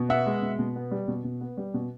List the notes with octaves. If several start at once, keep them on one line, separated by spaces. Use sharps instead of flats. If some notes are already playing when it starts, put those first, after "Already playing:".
Already playing: B2
B3 E5 F#5
G#3
B2
B2
B3
G3
B2
B2
B3
G3
B2